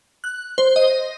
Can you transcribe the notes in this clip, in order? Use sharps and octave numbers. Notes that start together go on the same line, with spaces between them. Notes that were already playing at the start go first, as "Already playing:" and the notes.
F#6
C5
D#5